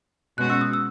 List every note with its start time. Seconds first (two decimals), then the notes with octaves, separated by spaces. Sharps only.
0.38 B2 G#3 C#4 F#4 F#6
0.50 E6
0.61 D#6
0.73 E6